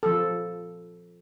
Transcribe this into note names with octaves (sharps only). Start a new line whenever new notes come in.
F3 A4